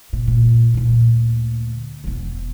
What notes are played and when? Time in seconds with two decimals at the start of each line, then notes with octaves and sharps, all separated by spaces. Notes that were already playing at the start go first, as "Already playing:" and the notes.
0.13 A#2
0.27 A#2
0.74 D2 A#2
2.04 E1 B3